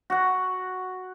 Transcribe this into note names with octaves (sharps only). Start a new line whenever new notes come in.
F#4 F#5